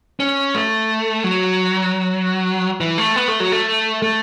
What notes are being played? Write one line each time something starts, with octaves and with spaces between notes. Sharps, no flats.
C#4
A3
F#3
E3
A3
B3
A3
F#3
A3
A3